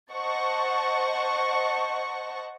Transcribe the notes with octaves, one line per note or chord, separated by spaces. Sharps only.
C5 D#5 F#5 A5 C#6